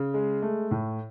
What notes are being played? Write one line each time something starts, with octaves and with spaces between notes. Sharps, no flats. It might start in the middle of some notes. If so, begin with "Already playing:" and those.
Already playing: C#3
G#3
A3
A2